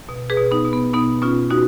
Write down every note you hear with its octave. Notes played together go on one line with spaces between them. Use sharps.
B2
G#4 B4
B2
B3 D#4
B2
B3
B2 B3 D#4
B2 C#4 F4
B2 D#4 F#4